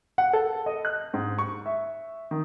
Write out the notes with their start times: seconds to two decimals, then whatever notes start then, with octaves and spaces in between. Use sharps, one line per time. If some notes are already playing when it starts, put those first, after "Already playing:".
0.18 F#5
0.33 A4
0.66 D#5
0.85 F#6
1.14 G#2
1.39 C#6
1.66 E5
2.31 D#3